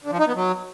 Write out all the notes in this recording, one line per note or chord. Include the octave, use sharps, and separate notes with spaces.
D3
F3
D#4
B3
F#3